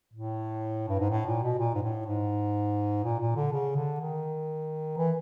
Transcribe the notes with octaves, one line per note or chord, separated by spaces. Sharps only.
A2
G2
G#2
A2
A#2
B2
A#2
G#2
A2
G#2
A#2
A#2
D3
C#3
D3
D#3
E3